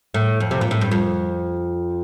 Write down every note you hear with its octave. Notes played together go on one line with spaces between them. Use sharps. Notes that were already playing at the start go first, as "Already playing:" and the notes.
A2
F2
C3
A#2
A2
G2
F2